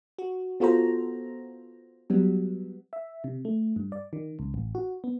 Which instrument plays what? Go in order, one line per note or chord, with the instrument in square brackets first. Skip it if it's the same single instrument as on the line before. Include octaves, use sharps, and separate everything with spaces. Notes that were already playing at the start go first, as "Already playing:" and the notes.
[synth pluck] F#4
B3 F4 F#4 A4 C5 A#5
F#3 G3 B3
[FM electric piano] E5
C3
A3
G2
D5
D#3
C#2
A1
F#4
B3